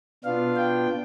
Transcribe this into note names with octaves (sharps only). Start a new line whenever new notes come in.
B2 B3 D4 F4 F5
G5